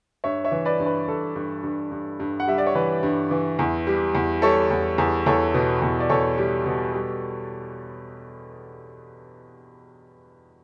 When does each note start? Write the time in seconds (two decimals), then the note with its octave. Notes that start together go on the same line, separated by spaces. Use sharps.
0.24 G2 C#5 E5
0.44 C#5 E5
0.52 E3
0.65 B4 D5
0.80 G2
0.86 B4
1.07 G2 A4
1.35 G2
1.63 G2
1.91 G2
2.20 G2
2.40 F#5
2.48 G3 E5
2.58 D5
2.66 C#5
2.75 E3 B4
3.03 G2
3.31 E3
3.59 E2
3.87 G3
4.15 E2
4.42 G3 A4 C#5
4.70 E2
4.98 E2
5.26 E2 A4 C#5
5.54 B2
5.82 E2
6.00 D5
6.10 E2 A4 C#5
6.38 G3
6.66 B2
6.94 G3